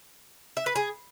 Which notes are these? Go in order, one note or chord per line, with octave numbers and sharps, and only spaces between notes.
E5
B4
G#4